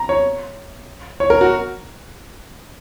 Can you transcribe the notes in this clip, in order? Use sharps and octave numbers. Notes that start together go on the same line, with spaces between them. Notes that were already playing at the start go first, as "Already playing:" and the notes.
Already playing: A#5
C#5
C#5
A#4
F#4